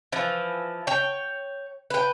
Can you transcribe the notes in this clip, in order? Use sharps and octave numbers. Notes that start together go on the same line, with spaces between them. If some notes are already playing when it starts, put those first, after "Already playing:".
E3 F3
C#5 G5
B4 G5